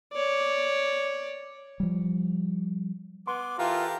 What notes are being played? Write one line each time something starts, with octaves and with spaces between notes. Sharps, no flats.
C#5 D5
F3 G3
B3 C6 D6
E3 F4 G4 A4 A#4